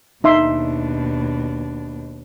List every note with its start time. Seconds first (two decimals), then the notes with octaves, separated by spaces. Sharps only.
0.24 D#2 B2 D4 D#4 E5 C6